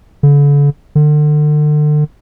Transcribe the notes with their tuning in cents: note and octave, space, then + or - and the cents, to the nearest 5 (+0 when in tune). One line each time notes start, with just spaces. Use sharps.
D3 -40
D3 +35